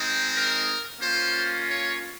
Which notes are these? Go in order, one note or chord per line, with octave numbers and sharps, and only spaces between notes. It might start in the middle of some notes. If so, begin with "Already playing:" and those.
Already playing: G#3 C4 D#4
A#4
A#3 C#4 F4 C5
C#5